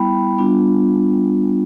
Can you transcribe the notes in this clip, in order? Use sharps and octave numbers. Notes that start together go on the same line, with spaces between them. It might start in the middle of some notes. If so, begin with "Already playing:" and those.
Already playing: G3 B3 E4 G5 B5
G3 B3 D4 F4